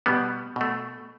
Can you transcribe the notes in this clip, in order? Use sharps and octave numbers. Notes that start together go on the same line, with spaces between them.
B2 G3 B3
B2 A3